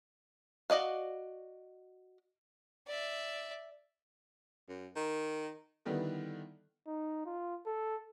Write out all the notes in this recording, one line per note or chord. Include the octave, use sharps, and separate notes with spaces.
F#4 D5 D#5 F5
D5 E5
F#2
D#3
D3 D#3 G3 B3 E4
D#4
F4
A4